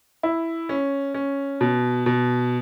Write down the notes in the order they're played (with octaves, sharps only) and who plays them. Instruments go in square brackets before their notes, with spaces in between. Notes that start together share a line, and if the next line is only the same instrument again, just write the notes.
[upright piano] E4
C#4
C#4
B2
B2